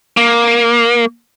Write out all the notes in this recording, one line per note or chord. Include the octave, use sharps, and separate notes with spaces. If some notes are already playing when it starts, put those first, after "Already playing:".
A#3